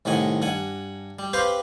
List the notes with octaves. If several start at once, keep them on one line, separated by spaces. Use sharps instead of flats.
C2 A2 D#3 F#5 G#5
G2 F#5 G#5
G3
C4 G4 B4 C5 F5